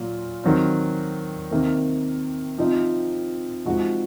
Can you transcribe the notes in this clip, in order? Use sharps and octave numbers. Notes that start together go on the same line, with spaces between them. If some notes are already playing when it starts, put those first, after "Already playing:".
Already playing: A#2 F#3 F4
D#3 F#3 C4
C3 D#3 A#3
C3 F3 C4 D#4
C3 F3 G#3 D#4 F#4